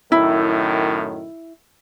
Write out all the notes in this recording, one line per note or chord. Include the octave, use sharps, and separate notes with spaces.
F#2 A2 D#3 E4